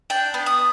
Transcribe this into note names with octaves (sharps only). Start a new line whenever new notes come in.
D4 G5
B3
D#6